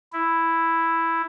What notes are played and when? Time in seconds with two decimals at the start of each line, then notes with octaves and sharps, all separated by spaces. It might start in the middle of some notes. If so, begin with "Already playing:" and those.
0.13 E4